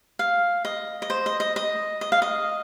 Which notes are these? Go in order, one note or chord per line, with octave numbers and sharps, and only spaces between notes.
F5
D#5
D#5
C5
D#5
D#5
D#5
D#5
F5
D#5